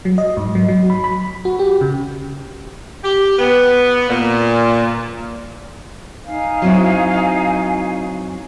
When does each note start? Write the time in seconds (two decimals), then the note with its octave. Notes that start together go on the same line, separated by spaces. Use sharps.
0.05 F#3
0.18 D#5
0.37 G#2
0.55 F#3
0.68 F#3
0.90 B5
1.04 B5
1.45 F#4
1.59 G4
1.81 C#3
3.04 G4
3.39 B3
4.10 A#2
6.26 D#4 F5 G#5
6.62 F#3 C4 E4